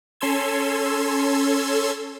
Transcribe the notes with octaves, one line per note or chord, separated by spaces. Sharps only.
C#4 A4 C6 E6 G#6